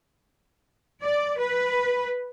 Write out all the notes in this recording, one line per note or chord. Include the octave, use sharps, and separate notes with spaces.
D5
B4